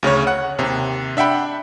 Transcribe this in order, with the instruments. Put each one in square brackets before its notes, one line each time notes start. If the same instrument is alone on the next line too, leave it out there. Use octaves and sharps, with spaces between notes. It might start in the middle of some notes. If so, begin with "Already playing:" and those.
[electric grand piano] D2 C#3 C#4 C#5
F#5 F#6
D#2 C3
D4 E5 F#5 G5 B5